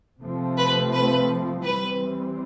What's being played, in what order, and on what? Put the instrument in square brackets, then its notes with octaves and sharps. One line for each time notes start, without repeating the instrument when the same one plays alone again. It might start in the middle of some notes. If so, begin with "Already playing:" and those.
[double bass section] C3 F3 A3 C4
[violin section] B4
B4
[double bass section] E3 G3 C4 [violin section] B4